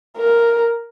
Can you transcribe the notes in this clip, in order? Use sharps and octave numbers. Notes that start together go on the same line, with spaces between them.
A#4